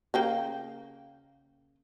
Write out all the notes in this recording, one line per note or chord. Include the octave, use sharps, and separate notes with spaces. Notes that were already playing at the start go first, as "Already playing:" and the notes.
C#3 A#3 G5